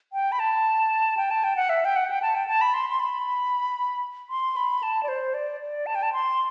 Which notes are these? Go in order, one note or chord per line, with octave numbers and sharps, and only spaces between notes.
G5
B5
A5
G5
A5
G5
F#5
E5
G5
F#5
G5
A5
G5
A5
B5
C6
C6
B5
C6
B5
A5
D5
C5
D5
D5
A5
G5
A5
C6